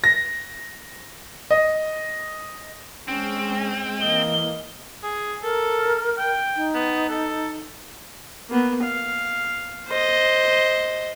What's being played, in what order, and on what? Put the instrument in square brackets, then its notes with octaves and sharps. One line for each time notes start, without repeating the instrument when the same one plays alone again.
[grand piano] A#6
D#5
[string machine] G#3 [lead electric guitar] C4 [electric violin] C#4
[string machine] E3 [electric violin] A#3 D#5 [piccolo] G7
[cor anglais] G#4
[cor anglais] A4 [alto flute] A#4
[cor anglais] G5
[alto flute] D#4
[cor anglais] B3
A4
[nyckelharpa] A#3 B3
F5
C5 D#5